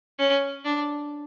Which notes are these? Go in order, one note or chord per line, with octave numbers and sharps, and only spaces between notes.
C#4
D4